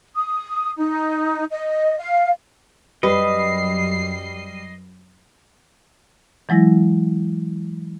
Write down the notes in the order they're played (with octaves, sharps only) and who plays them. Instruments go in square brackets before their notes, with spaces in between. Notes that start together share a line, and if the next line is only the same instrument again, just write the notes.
[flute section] D#6
D#4
D#5
F5
[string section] F#2 C7 [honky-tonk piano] G3 [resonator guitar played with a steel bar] B4 [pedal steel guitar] D#5
[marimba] E3 F#3 G#3 E4 A#6